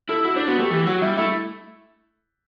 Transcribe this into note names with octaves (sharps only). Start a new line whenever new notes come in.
E4 A4
E4 F#4
D4 C5
B3 F#4
A3 G4
E3 G4
F#3 F#4
G3 E4
A3 E4